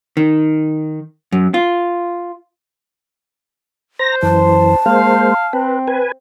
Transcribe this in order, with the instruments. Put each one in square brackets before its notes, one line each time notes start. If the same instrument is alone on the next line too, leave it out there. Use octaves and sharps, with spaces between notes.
[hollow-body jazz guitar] D#3
F#2
F4
[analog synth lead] C5 [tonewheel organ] A#5 A#6
[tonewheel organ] F#2 E3 [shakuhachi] A5
[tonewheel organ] G#3 A#3 C5 [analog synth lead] F5
[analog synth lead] C4 [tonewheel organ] B4
[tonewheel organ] B4 G#5